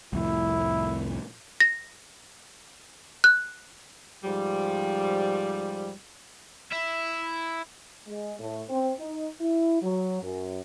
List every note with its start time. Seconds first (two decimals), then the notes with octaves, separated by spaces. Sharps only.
0.13 C2 F2 A2 E4
1.60 A#6
3.24 F#6
4.23 G#2 F3 G3
6.72 E4 E5
8.08 G#3
8.39 A2
8.69 C4
8.99 D#4
9.40 E4
9.82 F#3
10.22 F#2